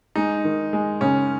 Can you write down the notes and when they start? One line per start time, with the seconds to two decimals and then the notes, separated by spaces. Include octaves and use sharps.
0.16 G#3 D#4
0.45 D#3
0.73 G#3
1.01 C#3 C#4